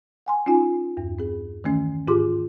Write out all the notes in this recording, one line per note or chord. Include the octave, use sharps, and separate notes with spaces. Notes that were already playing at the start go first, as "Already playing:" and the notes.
F#5 G#5 C6
C#4 D#4 F4 G#5
E2 G2
C4 G#4
D#3 E3 A3 C#4
G#2 F4 G4 G#4 C6 D6